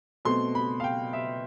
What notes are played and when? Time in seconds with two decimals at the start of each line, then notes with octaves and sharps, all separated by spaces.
0.25 B2 A3 C4 C6
0.55 B5
0.80 F5
0.84 G5
1.13 E5